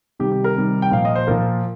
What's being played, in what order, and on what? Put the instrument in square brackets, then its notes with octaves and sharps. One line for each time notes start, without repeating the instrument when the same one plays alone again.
[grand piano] C3 D#3 G3 G4
G4
A#4
C3 D#3 G3
G5
A#2 F3 F5
D#5
C5
A#2 F3 A#4